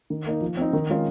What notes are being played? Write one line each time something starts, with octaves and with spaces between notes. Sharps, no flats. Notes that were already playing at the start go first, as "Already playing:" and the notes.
D#3
A#3 D#4
F3
C4 D#4
D#3
G#3 C#4 F4